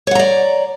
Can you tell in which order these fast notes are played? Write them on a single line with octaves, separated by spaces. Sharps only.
C#5 F#5 A#5 D5